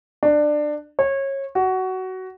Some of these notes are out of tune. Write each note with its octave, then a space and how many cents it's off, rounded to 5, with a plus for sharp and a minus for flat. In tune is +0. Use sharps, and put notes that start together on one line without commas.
D4 +20
C#5 -25
F#4 +15